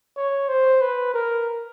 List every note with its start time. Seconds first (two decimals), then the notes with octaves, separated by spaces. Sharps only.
0.17 C#5
0.49 C5
0.82 B4
1.14 A#4